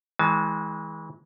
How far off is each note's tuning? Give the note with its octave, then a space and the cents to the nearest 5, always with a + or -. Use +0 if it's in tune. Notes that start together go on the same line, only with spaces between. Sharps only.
E3 -35 G#3 +0 A5 -40